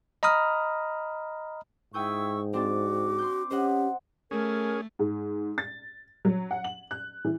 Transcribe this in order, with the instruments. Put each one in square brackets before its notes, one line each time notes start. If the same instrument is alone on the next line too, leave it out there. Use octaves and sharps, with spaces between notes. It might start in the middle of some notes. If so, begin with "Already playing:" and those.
[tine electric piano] D#5 A#5 B5 D#6 F6
[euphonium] G#2 [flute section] E4 C#6 E6 [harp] G5 D#6 G6
[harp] C4 D4 A6 [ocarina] F#4 [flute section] D6
[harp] C6 G6
[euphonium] C#4 [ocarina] G4 [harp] C5 D#5 F#5
[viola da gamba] A3 [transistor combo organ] C#4 G#4 [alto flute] A#4
[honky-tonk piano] G#2
A6
F#3
F#5
F#7
F#6
E3